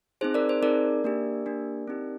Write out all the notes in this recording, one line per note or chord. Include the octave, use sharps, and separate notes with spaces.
C4 D#4 G#4 C5
A#4 D5
C5
C4 D#4 G#4 A#4 D5
A#3 D4 G4
A#3 D4 G4
C4 D#4 G4